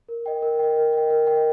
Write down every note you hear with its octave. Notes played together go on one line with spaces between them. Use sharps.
A#4
D#5 G5
A#4
D#5 G5
A#4
D#5 G5
A#4
D#5 G5